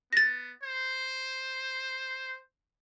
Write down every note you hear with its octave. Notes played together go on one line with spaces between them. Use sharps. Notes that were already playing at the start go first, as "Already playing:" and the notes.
B3 A6 A#6
C5